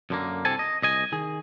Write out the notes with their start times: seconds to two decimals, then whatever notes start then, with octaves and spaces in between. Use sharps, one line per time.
0.10 F#2 D3 A#3
0.45 C2 C3 C4 A4 G#5 A5
0.59 D#5
0.83 C2 D#5 G#5
1.12 D#3 G#4